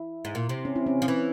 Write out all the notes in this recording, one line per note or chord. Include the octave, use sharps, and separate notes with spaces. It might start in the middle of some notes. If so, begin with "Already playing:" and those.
Already playing: E4
G#2
A#2
C3
C#4
E4
C#4
F3
E3